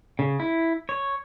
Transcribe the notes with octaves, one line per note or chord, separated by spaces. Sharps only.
C#3
E4
C#5